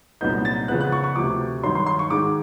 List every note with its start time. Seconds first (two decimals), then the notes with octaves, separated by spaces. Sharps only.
0.21 C2 A#2 F#3 B3 D#4 G6
0.45 A6
0.68 C#3 F3 G#3 B3 F#6
0.81 F#6
0.92 C#6
1.04 C#6
1.16 D2 C3 F3 D6
1.63 G2 D#3 F#3 C6
1.75 C6
1.86 C6
1.99 C#6
2.10 G#2 D#3 G#3 D6